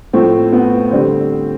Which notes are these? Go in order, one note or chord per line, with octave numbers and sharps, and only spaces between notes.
A2 F3 A3 C4
B3
D3 G3 C4